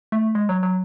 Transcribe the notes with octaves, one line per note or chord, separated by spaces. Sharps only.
A3
G#3
F#3
F#3